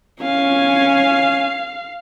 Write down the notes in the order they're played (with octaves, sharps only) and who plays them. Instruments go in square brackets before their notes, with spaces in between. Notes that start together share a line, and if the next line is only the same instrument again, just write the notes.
[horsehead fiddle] C#4 G#5 [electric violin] F5